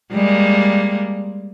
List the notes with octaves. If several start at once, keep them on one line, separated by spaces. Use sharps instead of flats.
G3 G#3 A#3